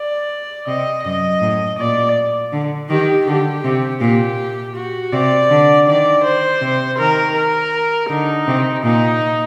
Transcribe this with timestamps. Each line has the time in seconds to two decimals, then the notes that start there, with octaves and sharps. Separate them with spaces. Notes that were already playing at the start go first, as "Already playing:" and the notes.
Already playing: D5
0.67 C3 D#5
1.04 F#2 D#5
1.41 A2
1.79 A#2 D5
2.53 D3
2.90 D#3 G4
3.27 D3 G4
3.65 C3
4.01 A#2 G4
4.76 F#4
5.12 C3 D5
5.50 D3
5.87 D#3 D5
6.24 C5
6.62 C3
6.98 D#3 A#4
7.36 A#4
8.10 D3 D#4
8.47 C3
8.84 A#2 D#4